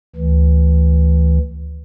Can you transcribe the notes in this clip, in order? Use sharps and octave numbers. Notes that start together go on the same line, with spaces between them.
D2 E3